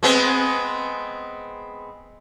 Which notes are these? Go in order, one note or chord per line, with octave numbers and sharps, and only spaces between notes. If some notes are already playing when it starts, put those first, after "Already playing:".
G#3 B3 C4